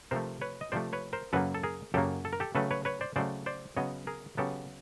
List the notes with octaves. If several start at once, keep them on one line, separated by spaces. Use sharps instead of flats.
C3 F3 A3 A#4 C5
B4 C#5
D#5
C3 F3 A3 C5 D5
B4 C#5
A#4 C5
F#2 C#3 F#3 A#3 A4 B4
A4
G#4 A#4
F#2 C#3 F#3 A#3 G4 A4
A4
A#4
G4 A4
C#3 F#3 A3 A4 B4
B4 C#5
B4 C#5
C5 D5
C#3 F#3 A3 C5 D5
C5 D5
C#3 F#3 B3 C#5 D#5
G#4 A#4
C#3 F#3 B3 G4 A4